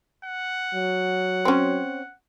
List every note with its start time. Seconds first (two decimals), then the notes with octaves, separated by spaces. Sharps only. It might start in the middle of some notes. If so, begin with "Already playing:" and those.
0.25 F#5
0.75 F#3
1.45 C4 C#4